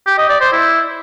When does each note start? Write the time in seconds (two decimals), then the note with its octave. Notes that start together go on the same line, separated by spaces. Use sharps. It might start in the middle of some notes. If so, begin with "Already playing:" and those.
0.07 G4
0.18 D#5
0.30 D5
0.41 C5
0.52 E4